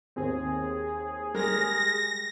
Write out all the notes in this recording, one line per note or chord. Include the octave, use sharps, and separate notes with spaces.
D#2 C4 G#4
G3 G#3 A#4 A#6